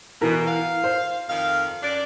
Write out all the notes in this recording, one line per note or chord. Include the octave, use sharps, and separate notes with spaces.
B2 E3 A#4
F5
C5
F2 D#3 F5
F#2 D4 D5